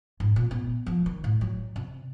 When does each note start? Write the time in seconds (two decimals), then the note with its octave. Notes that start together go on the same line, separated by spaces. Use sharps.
0.20 G#2
0.36 A#2
0.51 B3
0.86 F3
1.06 D#3
1.24 A2
1.41 F#3
1.76 C3